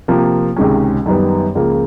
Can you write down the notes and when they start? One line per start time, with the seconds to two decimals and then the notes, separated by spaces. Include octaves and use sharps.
0.08 C3 F3 A#3
0.57 C#2 C3 D#3 G#3 C#4
1.06 F#2 D#3 G3 B3
1.55 C#2 C#3 F3 A#3